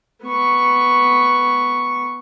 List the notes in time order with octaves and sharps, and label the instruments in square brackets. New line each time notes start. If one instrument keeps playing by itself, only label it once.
[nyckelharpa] B3 C#6